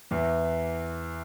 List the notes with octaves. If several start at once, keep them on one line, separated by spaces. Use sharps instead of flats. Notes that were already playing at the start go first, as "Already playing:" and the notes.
E2 E3